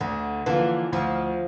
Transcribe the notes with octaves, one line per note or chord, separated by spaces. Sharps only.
D2 D3
D3 E3 F3 A#3
D2 F3